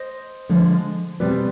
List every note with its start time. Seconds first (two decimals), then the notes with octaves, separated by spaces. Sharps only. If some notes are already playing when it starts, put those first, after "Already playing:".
Already playing: C5 D#5
0.49 D3 F3 G#3
1.20 B2 G3 C4 B4 D5